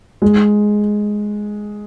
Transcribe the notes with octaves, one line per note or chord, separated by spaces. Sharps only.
G#3